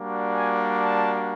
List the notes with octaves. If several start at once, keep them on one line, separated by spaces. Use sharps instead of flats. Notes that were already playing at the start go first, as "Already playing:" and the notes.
Already playing: G3 A#3 D4 F#4
G#5
A5